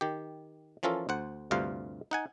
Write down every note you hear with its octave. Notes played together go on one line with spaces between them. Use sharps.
D#3 G4
E3 F3 C#4 F4 A4 A#4
D2 C5 F#5
D2 G2 C3 F4 F5
D#4 F#5 G#5